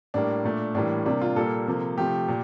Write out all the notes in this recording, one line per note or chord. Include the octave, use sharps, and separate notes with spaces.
A2 G3 A#3 D4
A#2 A3
A2 E3 G3 A#3 D4
C3 G3 A#3 D4
F4
A#2 G3 A#3 A4
C3 F3 A#3
C3 F3 A3 G4
A#2